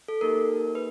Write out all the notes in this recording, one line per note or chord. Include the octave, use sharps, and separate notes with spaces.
A4
A#3 D#4 G4 A#4
B4